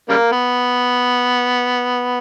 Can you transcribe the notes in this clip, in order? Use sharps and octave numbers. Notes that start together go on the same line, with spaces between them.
C#3 G3 A#3
B3